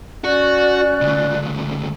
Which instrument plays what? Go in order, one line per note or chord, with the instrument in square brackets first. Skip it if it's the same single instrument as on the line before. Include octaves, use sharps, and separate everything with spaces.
[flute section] C#4 D5 F#6 [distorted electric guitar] F#4
[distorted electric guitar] D2 C#3